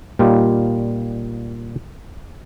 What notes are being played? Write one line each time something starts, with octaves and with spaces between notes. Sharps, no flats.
A#2 G3 D#4 F4 G4